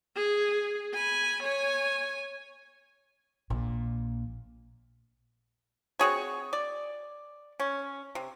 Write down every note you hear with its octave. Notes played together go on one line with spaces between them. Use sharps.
G#4
G#5 B5
C#5 G#5
A#1 A#2
C4 F#4 G#4 C#5
D5
C#4
C3